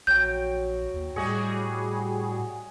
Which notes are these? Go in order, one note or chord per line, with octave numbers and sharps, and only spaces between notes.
A#1 F#3 G5 G6
D#2
A2 G3 F#4 G#4 D#5 G#5 C#6